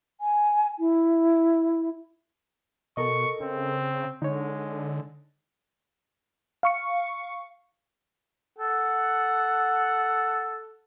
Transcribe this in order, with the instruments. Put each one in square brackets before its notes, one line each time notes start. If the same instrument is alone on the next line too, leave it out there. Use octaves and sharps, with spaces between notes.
[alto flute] G#5
E4
[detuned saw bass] B2 [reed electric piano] A4 A#4 D#5 [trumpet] C#6
[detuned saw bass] C#3 [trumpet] C4
[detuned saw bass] D3 [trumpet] G#3 [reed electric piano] D#4 C#5
[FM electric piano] F5 C#6 C#7
[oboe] A4 [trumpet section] F#5